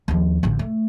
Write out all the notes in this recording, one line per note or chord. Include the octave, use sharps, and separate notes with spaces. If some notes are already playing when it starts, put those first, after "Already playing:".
D#2 F3
A1 D3
A3